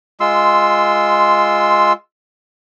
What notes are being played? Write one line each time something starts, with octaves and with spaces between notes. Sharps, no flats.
G#3 F4 C6 E6